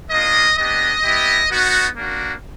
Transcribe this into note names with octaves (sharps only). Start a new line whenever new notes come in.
A#3 D4 F4 D#5
B3 D4 G4 D#5
B3 E4 G4
B3 D#4 F#4
A#3 D4 F#4